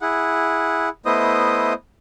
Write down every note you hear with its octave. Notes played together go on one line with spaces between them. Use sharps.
E4 G#4 F#5
A3 B3 E4 C5 D#5 D#6